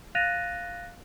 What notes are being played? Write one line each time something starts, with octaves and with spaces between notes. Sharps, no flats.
F5 F#6 A6 A#6 D#7 F7